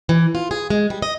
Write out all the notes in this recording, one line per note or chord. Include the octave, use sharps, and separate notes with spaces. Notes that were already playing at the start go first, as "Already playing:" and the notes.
E3
F4
G#4
G#3
G3
D#5